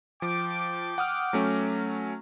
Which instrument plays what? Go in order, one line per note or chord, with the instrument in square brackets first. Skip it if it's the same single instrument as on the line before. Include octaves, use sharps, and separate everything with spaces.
[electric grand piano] F3 [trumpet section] G5 D6
[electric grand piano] F#5 D#6 F6
F#3 A3 C#4